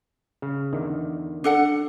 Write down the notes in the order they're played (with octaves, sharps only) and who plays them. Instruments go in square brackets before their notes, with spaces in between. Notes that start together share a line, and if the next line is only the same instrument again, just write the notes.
[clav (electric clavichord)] C#3
E2 D3 D#3
[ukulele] D4 A4 F#5